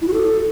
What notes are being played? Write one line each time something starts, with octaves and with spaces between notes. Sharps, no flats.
E4
F#4
A4